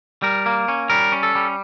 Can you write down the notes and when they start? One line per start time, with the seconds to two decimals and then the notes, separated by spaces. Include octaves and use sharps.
0.22 G3 A#4
0.46 A#3
0.68 C#4
0.90 G3 A#4
1.12 C#4
1.23 A4
1.35 G3